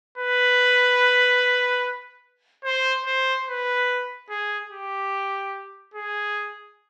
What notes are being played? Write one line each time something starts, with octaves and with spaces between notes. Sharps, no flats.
B4
C5
C5
B4
G#4
G4
G#4